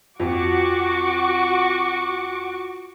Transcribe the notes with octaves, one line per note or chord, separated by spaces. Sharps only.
F2 F#4 C#6 D6